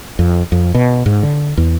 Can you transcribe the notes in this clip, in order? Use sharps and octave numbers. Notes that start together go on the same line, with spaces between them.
F2
F2
B2
G#2
D3
E2